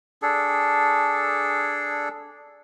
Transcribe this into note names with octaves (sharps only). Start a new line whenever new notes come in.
D4 G#4 A4